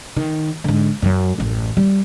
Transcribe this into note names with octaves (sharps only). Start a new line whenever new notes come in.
D#3
G#2 D3
F#2 F#3
A1 F#2
G3